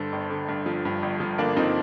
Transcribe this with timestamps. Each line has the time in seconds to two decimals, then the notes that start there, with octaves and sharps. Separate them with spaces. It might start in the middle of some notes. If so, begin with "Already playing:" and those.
Already playing: G2 D3 A4 C5
0.12 G1
0.30 D3
0.48 G2
0.66 F3
0.85 G2
1.02 G1
1.20 F3
1.38 D3 A#3 D4
1.56 F3 C4 D#4